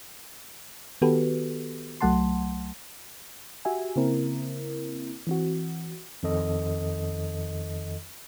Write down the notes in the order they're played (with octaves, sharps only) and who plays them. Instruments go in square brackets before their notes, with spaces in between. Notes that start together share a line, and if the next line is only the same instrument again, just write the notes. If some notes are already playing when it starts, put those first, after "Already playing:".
[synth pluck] D#3 B3 F#4 G4 A4 B4
C2 F#3 A3 F#5 A5 C6
[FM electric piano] F#4 G4 E5 G#5
C#3 A#3 C4 E4 A#4
E3 C4 F#4
[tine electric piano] F2 D#3 A4 D#5